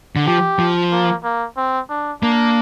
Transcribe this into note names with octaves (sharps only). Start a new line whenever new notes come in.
D3
F3 G4
F3
A#3
A#3
C4
D4
A#3 D4